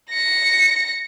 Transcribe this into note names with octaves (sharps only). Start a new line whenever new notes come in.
A#6 C#7